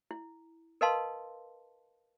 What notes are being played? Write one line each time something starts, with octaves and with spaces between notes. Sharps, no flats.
E4
A#4 B4 D#5 F5 A5 C6